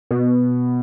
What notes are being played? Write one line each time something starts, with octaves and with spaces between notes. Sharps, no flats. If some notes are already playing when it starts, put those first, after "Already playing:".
B2